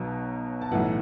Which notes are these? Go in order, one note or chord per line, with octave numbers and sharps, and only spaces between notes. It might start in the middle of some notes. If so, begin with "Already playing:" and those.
Already playing: B1 B2 F#3
A5
B1 A2 E3 F#5